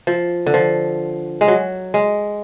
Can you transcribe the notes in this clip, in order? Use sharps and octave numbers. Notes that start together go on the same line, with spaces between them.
F3
D3
F3
G#3
F#3
G#3